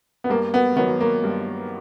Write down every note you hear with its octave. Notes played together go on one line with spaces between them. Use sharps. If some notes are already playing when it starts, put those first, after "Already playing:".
B3
G2 A#3
B3
D#3 F#3 B3
A#3
G2